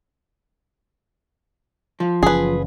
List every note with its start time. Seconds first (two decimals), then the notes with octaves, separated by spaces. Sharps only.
2.00 F3
2.23 F#1 E3 C#4 G#4 B4